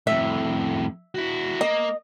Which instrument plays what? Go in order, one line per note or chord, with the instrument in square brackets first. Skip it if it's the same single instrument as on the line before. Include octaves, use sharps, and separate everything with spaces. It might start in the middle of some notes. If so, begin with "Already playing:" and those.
[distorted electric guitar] F2 A2 [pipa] E5
[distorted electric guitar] E4 F#4
[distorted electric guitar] A#3 [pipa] D#5